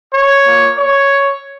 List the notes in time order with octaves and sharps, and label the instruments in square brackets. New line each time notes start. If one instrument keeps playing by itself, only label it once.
[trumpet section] C#5
A#3 F4
C#5